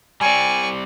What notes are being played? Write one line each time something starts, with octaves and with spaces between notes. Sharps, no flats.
G3 C4 D5 G#5 C#6